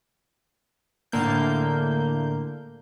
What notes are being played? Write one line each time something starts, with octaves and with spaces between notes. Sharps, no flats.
A2 D3 A#3 G6